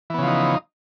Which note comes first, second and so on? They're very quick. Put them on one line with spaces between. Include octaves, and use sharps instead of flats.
E3 B3 C#3 F3 D#4